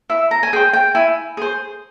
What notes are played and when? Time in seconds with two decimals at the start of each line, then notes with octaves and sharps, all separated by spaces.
0.09 E4 E5
0.31 A#5
0.43 G#5
0.53 G#4 C5 G5
0.73 G5
0.95 E4 G#5
1.37 G#4 C5